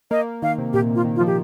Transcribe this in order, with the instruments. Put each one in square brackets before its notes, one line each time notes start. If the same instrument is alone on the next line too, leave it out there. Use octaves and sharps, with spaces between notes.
[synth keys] A#3 [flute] D#5
[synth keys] D#3 [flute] F5
[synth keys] C3
[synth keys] A#2 [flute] G4
[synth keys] C3
[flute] F4
[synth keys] D#3
[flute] F4
[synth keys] F3
[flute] G4